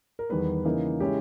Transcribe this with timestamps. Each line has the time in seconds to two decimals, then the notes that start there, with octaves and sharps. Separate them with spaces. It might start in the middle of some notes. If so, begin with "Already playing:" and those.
0.19 A#4
0.29 E2 D#3 G3 B3 B4
0.65 C#3 E3 A#3 D#4
1.00 C#3 G#3 C#4 E4 G4